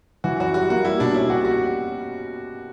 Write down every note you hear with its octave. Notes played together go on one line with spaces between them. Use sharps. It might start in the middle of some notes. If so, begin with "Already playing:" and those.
E3 F#4
F#2 F#4
G3 F#4
A#3 F#4
G3 E4
B2 D4
C#4 E4
F#4 G4
F#4